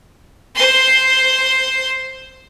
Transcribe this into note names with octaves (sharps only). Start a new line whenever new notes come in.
C5 C6